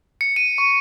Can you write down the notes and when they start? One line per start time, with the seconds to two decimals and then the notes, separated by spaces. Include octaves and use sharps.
0.21 C#7
0.36 D#7
0.58 C#6